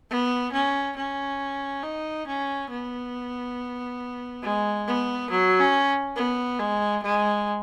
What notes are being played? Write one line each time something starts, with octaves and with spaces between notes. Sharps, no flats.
B3
C#4
C#4
D#4
C#4
B3
G#3
B3
F#3
C#4
B3
G#3
G#3